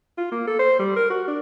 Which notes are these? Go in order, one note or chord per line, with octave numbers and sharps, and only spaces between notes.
F4
A#3
A4
C5
G3
A#4
F#4
D4